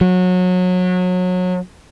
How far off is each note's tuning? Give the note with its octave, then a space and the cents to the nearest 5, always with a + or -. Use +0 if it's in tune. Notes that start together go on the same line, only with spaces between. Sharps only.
F#3 -25